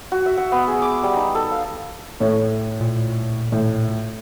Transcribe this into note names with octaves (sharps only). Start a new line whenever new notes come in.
F#4
E5
F#5
B3
G#4
D6
G3
D#4
A4
F5
A2 A3 C#5
A#2
A2